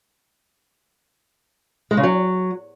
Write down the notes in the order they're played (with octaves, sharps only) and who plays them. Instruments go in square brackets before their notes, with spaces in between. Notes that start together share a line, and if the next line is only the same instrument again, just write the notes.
[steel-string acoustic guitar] G#3
C#3
F#3